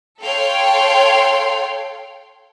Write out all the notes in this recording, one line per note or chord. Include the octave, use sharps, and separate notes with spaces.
A4 C#5 F5 G5 C6